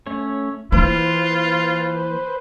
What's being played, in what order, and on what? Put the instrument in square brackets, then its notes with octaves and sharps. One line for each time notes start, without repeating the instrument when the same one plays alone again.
[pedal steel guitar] A3 C#4 C#5
[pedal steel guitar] E3 [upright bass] A#3 [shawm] F4 [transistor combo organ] B4 C5